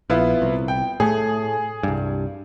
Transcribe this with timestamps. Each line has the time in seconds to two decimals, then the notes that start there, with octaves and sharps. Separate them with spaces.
0.10 A#1 B3 E4 F4
0.42 C2
0.68 G5
1.00 A2 A3 G#4
1.83 C2 G2